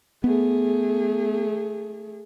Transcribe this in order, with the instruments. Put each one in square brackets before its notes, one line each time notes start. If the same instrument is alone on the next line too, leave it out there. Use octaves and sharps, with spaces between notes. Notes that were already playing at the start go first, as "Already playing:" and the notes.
[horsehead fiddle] A3 G#4 [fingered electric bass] B3